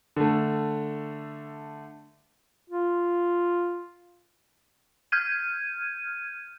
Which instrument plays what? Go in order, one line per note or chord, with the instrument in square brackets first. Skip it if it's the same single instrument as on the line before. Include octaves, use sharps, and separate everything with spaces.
[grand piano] D3 A3
[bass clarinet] F4
[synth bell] F6 G6 G#6 D#7